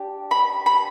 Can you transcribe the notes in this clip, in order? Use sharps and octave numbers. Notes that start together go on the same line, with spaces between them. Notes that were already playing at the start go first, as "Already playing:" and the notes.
Already playing: D4 G4
B5
B5